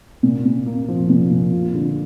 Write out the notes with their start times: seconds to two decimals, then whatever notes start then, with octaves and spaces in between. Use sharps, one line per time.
0.23 A#2
0.45 A#2
0.66 A#3
0.88 F3
1.10 A#2
1.30 A#2
1.53 F4
1.75 D3